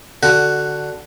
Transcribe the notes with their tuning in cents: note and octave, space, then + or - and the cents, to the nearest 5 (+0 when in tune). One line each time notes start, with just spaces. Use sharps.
D3 +0 F#4 +5